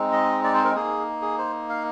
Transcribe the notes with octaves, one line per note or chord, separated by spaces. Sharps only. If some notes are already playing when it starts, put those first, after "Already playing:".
Already playing: G#3 C4 D#4
D#5
D5
C5
A#4
A#3 D#4 G#4
G#4
C5
F5